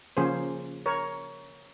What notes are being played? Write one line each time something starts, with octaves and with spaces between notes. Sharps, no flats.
C#3 F3 A#3 C#4 G#4 C5
A#4 C#5